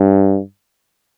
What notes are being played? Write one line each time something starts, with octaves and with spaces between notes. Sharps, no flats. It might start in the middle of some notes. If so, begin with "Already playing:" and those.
Already playing: G2